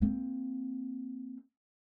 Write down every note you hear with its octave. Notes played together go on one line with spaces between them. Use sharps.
A#3 C4